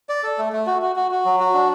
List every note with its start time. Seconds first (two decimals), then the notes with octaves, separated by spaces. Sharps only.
0.09 D5
0.23 A4
0.38 A3
0.53 A3
0.67 F#4
0.82 F#4
0.96 F#4
1.11 F#4
1.25 F#3
1.40 F#4
1.54 D4